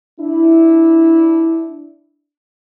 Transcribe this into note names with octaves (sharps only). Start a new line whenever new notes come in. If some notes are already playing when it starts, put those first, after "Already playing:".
D4 E4